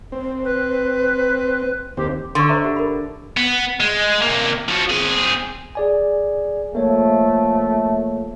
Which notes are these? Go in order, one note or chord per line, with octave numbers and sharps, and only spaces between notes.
C4
B4
D#2 C4 G4
D3 C6 C#6
C5 E5 A#5
G4 F#5
A#4 B5
B3
G#3
C3 A#3
F3 F#4
C4 G#4
G#4 D5 G#5
F3 A3 A#3 C#5